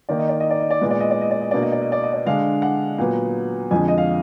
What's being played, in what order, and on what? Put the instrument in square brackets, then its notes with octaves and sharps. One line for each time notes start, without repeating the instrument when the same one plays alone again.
[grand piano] D#3 A#3 D#4 D5
D#5
D5
D#5
D5
D#5
D5
A#2 G#3 B3 D#5
D5
D#5
D5
D#5
D5
D#5
B2 A#3 D4 D5
D#5
D5
D#5
D5
D#5
D5
D3 G#3 D4 F5
F#5
A#2 F#3 B3
F2 D3 F3 G#3 G#5
D#5
F5